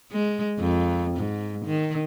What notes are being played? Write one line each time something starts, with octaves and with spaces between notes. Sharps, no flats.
G#3
F2
G#2
D#3